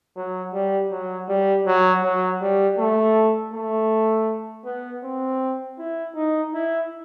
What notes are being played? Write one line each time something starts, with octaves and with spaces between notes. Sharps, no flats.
F#3
G3
F#3
G3
F#3
F#3
G3
A3
A3
B3
C4
E4
D#4
E4